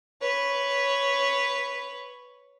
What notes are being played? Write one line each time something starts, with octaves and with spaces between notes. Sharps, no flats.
B4 C#5